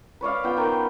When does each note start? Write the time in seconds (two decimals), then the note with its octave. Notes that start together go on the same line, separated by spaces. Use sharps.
0.21 B4 C#5 D5 F5
0.44 B3 F4 G5
0.57 D#3